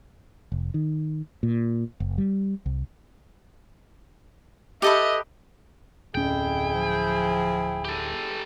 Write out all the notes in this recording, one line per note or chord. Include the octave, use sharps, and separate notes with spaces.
F1
D#3
A#2
F#1
G3
C2
G4 A4 B4 D#5 E5
D1 F2 C#4 E4 G#4 G5
F3
G4 A4